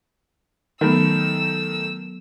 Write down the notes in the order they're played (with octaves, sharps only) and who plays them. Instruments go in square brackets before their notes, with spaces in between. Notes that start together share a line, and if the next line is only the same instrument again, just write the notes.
[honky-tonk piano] D#3 A3 [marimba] F#3 B3 [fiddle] E6